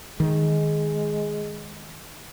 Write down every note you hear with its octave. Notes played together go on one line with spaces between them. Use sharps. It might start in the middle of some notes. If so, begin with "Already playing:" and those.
D#3 G#3